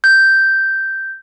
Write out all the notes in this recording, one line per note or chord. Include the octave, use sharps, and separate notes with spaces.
G6